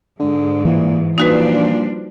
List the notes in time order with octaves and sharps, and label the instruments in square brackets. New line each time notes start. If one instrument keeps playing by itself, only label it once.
[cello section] G#2 [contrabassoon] D3
[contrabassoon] A#2 [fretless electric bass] E3
[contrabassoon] A#2 [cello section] F3 G3 D4 [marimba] D#4 F#4 B4